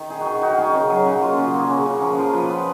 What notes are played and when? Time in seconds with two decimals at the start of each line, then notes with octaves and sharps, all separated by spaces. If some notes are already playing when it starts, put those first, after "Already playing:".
Already playing: D#3
0.10 D#4 G#4
0.21 F#4
0.26 D#3
0.41 D#4 F#4
0.51 A#4
0.58 D#4 G#4
0.74 C#3 A#4
0.89 F#3 G#4
1.06 C#3 F#4
1.21 A#3 F4
1.37 C#3 F#4
1.48 F#4
1.54 A#3 G#4
1.70 C#3 F#4
1.86 C#3
2.02 F3 G#4
2.17 F3 A#4
2.33 F3 B4
2.50 B3